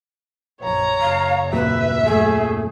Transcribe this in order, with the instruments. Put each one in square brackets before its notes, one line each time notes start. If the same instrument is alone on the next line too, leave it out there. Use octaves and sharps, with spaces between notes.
[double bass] A#1 F#2 [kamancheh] C#5 A#5
[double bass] F#1 [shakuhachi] F5
[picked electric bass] D#2 A#2 F#3 [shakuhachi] B4 [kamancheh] E5
[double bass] F#2 A3 [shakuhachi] G#4